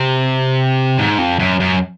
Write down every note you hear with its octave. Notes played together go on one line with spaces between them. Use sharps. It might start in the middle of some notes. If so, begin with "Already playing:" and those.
Already playing: C3
G#2
F2
F#2
F#2